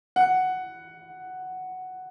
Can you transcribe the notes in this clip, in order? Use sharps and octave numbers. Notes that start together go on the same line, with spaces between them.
F#5